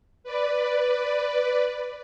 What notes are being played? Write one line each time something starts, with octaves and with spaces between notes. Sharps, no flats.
B4 D5